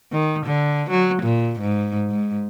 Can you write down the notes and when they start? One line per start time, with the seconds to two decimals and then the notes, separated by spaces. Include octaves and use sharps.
0.12 D#3
0.46 D3
0.90 F#3
1.23 A#2
1.60 G#2
2.10 G#2